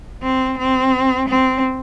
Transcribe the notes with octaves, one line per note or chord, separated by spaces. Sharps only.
C4
C4
C4